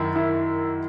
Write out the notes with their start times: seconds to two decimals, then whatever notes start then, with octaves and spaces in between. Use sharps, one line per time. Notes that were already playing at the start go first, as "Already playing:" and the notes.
Already playing: F#2 D#3 E4
0.16 E4